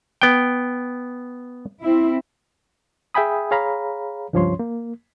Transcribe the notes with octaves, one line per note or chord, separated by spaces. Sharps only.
B3 G5
C4 E4
G#4 E5 G5 G#5 B5 D#6
G#4 C#5 F5 A#5 B5
C#2 G2 F3 C#4 C#5 C6
A#3